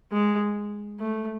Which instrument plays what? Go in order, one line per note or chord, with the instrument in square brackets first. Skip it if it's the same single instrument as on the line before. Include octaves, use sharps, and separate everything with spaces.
[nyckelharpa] G#3
A3